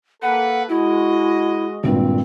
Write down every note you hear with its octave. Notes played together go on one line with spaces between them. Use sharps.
A#3 A4 B4 F#5
G#3 E4 F#4 D#5
G#1 G2 A#2 C4